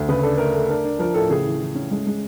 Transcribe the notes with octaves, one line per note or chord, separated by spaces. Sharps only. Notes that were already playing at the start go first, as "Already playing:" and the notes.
Already playing: D2
C#3 B4
D4 A4
A3 A#4
A3
D4 A#4
D4
F3 A#4
A2 A4
C#3 G#4
E3
E3
C#4
G#3
G#3